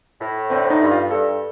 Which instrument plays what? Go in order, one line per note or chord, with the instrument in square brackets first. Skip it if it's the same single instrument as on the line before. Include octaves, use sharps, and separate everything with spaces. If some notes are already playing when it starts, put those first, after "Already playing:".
[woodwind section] A2
[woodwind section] D3 [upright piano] C4
[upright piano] D#4
[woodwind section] G2
[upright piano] F4
[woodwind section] G2 [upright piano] A4